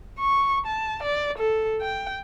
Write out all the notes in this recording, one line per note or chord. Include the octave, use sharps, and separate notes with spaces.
C#6
A5
D5
A4
G5